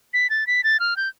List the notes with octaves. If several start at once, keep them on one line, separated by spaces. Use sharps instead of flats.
B6
A6
B6
A6
F6
G6